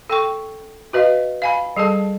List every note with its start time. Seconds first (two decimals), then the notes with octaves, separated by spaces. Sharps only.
0.10 A4 G5 C#6
0.93 F#4 B4 D#5 F5
1.42 F5 G#5 B5
1.76 G3 G#4 A4 A5